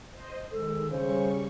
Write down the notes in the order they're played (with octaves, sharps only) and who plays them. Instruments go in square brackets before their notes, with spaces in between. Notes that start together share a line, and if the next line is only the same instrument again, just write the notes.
[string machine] C5 D#5
[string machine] D#3 G#3 [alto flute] A4
[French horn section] C#3 [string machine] G3 C#6 [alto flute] C5